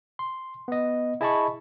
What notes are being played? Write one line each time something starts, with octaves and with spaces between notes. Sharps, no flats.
C6
B3 D#5
E4 G#4 D#5 A5 B5 C#6